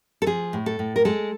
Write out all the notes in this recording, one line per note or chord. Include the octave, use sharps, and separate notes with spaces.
A4
F3 G#4
A2
A4
A2
A#4
G#3 A4